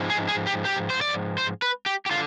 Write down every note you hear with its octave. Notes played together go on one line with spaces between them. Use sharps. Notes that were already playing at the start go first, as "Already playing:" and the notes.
Already playing: G#2 F3 G#3 C4
G#4
G#4
G4
G4
C5
D5
C5
B4
G4
G4
D3 F4